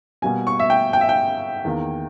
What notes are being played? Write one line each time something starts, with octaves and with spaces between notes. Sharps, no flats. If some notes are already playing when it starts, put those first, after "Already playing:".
B2 G3 A#3 G#5
C#6
E5
G5
G5
E5
G5
E2 D#3 A#3